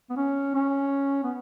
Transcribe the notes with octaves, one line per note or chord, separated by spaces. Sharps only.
B3
C#4
C#4
B3